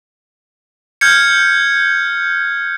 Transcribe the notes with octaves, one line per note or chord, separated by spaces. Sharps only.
F6 G6 G#6 C#7